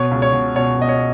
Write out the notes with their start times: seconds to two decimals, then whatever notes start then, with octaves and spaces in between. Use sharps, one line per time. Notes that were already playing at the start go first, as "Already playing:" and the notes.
Already playing: B2 C#5
0.11 C#2
0.22 C#5
0.33 B2
0.56 B2 C#5
0.78 B2 D#5
0.89 C#5